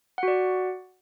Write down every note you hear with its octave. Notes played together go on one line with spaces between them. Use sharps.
F#4 D5 F#5